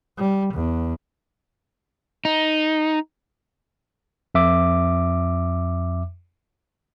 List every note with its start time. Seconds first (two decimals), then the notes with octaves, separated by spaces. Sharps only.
0.18 G3
0.54 E2
2.25 D#4
4.35 F2 E5 D6